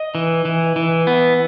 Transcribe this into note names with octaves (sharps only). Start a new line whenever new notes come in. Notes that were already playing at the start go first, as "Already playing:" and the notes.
Already playing: D#5
E3
E3
E3
B3